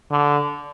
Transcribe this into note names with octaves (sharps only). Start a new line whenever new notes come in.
D3